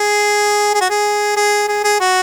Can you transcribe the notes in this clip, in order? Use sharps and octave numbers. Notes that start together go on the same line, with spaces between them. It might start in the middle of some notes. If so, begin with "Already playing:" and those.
Already playing: G#4
G#4
F#4
G#4
G#4
G#4
G#4
F#4